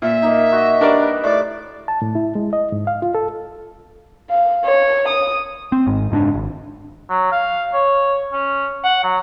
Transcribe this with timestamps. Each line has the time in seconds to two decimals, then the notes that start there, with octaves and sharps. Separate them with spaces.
0.02 A#2 E5
0.22 A#3 D#4
0.52 F#4 D#5
0.81 G3 D4 A#4 D5
1.01 B4
1.24 A2 E4 D5
1.88 A5
2.02 A2
2.15 E4
2.35 G#3
2.53 D#5
2.72 G#2
2.87 F5
3.02 F4
3.15 A4
4.30 F5
4.66 C#5
5.09 D#6
5.72 C4
5.87 G#1 G#2
6.11 F#1 G#2 C#4 D4
6.34 G#1
7.10 F#3
7.32 F5
7.73 C#5
8.33 C#4
8.84 F#5
9.04 F#3